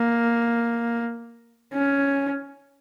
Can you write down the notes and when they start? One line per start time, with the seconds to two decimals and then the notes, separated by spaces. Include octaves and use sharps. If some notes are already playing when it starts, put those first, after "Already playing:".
Already playing: A#3
1.73 C#4